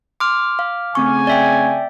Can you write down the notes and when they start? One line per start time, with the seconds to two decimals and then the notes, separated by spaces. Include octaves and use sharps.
0.20 C6 D6 F6
0.59 F5
0.95 C#3 A3 C4 G#5 C#6
1.27 D5 E5 G5